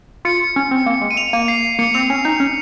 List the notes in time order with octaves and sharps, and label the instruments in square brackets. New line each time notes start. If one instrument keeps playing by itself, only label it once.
[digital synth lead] F4 [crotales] C#7
[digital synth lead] C#4
C4
A#3
G#3
[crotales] D#7
F7
[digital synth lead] A#3 [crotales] D#7
[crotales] C7
[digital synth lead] A#3 [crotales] C#7
[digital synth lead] C4 [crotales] F7
[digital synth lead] C#4
D#4
C#4